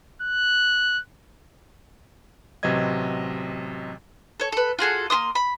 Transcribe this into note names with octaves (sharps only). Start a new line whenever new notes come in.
F#6
A1 C3 F#3 B4 D#5 G#6
A4 C#5
A4 B4
F4 F#4 G#4 A4
A#3 G#4 C6 D#6
B5